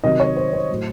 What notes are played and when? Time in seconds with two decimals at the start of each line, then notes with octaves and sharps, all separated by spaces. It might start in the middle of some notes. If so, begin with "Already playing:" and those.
0.04 C3 D#3 F#3 D#5
0.20 C#5
0.36 C5
0.53 C5
0.70 A2 F#3